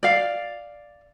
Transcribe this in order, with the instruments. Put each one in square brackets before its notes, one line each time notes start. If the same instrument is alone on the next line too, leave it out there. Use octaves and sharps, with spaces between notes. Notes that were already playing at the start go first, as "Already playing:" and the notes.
[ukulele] D5 F5